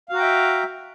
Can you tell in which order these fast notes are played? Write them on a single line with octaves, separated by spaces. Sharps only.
F5 F#4 A#5 G5 E5